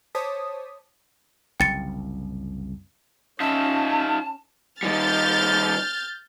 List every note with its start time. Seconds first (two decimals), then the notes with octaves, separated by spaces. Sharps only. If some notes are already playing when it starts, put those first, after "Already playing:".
0.15 C5 C#5 A5 D6 D#6 B6
1.60 F#1 C2 G5 A6 C#7
3.40 C#4 D#4 F4 E5 A5
4.83 D#3 G3 F6 G6 A6